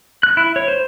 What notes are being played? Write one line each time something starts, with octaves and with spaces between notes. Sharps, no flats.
F#6
E4
C#5
C5